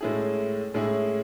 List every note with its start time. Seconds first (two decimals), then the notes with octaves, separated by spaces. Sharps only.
0.01 A2 G#3 C#4 E4 G#4
0.74 A2 G#3 C#4 E4 G#4